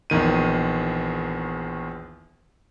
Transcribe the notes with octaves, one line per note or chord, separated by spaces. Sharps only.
A#1 E2 D#3 D#7